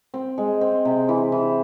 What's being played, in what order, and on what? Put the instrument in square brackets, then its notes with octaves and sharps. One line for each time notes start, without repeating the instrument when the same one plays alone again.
[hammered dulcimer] C4
G#3
C4
C3
E3
E3